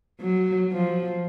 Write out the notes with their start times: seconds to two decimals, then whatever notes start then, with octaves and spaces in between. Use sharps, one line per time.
0.20 F#3
0.72 F3